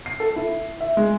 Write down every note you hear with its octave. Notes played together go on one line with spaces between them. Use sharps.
C7
A4
E4
E5
G#3